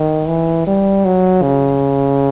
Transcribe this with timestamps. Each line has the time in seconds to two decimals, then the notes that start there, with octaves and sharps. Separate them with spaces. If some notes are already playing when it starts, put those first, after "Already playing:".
Already playing: D#3
0.28 E3
0.67 G3
1.05 F#3
1.42 C#3